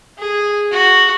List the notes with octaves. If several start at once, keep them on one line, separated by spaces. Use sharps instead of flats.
G#4
F#4